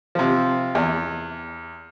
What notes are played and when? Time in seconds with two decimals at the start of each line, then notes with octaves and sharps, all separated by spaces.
0.15 C3 F3
0.75 E2